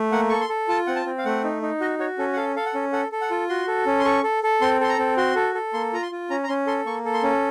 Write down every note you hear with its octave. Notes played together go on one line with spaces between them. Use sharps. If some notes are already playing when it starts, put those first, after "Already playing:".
Already playing: A3
A#3 F#5
A4 C#6
C6
A4
F4 A5
C4 F#5
A5
C4
F5
A3 F#5
D#4
D#4
F#4 D#5
F#4 C#5
C#4 A4
F#5
A4 F5
A4 F5
F#5
C#4
A4 F#5
A4
F#5
F4
F#4 C6
A4
C#4
C6
A4 C#6
A4
A4
C4 C6
A4 C6
A#5
C4
F#4 C6
A4
A4
A#3 C6
F4 A#5
C6
F4
C#4 A#5
A#5
C#4 C6
A4 C6
A#3 C#6
A4
C6
C#4